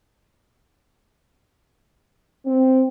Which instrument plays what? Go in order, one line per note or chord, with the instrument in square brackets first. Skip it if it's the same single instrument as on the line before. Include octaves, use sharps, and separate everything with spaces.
[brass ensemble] C4